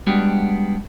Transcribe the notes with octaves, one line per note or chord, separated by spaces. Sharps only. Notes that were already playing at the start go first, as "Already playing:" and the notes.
G3 G#3 B3 D4 F#4 G4